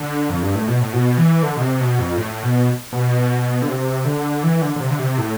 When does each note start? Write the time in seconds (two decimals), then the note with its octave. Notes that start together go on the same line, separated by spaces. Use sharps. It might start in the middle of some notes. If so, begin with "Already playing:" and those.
Already playing: D3
0.30 F2
0.42 G2
0.55 A2
0.68 B2
0.81 A2
0.93 B2
1.18 E3
1.43 D3
1.57 B2
1.61 C3
1.80 B2
1.99 F2
2.18 A2
2.43 B2
2.93 B2
3.62 D3
3.68 C3
4.05 D3
4.43 E3
4.62 D3
4.76 D3
4.80 C3
4.90 D3
4.99 C3
5.18 A2